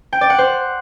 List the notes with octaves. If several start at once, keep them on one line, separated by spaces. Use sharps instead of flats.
G5
D5
F#5
C5